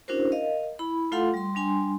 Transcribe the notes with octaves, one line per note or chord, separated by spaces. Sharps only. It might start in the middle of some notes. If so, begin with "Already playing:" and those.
C#4 D4 E4 F#4 A#4 C5
A#4 D#5 F5
E4 B5
A3 F4 A4 F5 F#5 C6
G3 C6
G3 D4 G#5 C6